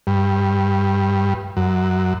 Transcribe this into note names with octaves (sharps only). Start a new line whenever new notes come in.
G2
F#2